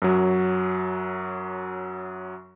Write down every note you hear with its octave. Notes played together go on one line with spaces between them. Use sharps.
F#2 F#3